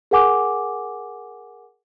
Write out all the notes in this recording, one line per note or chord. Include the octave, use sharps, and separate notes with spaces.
G#4 A#4 F#5 G#5 D6